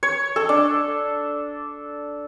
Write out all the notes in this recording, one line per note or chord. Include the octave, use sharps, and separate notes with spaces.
C#5
A4
D4